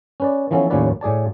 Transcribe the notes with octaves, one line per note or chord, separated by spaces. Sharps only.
C#4 B4 D5
E3 F3 B3 C#4 A4
D#2 A2 F3 C#4 B4 D5
A2 G#4 D5 A5